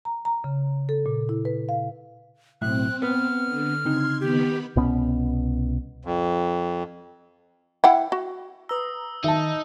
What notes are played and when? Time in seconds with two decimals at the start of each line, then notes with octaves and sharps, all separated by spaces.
0.05 A#5
0.25 A#5
0.44 C#3
0.89 A4
1.06 A#2
1.29 E4
1.45 B4
1.69 F5
2.62 B1 A2 C4 E5 F#6
3.02 B3 B4 F6
3.47 D3
3.85 C#3 C4 D#4 C6 G#6
4.21 D#3 B3 G4 B4
4.76 C2 B2 B3 C#4
6.05 F2
7.84 E4 F#5 G5
8.12 F#4
8.69 B4 A#5 D#6 E6
9.24 D#3 D#4 E5 A5